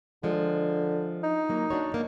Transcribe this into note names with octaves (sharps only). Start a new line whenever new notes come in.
D3 F3 G#3
D#4
F#3 A#3
D4 F#4 C#5
G#2 A#3